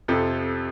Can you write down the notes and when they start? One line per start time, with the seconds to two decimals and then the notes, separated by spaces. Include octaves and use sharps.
0.08 F2 C3 F3 A4